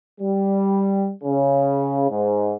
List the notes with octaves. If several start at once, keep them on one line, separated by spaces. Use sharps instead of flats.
G3
C#3
G#2